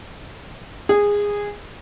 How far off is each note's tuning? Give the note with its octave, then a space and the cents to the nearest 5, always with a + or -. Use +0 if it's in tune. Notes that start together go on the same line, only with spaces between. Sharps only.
G#4 -15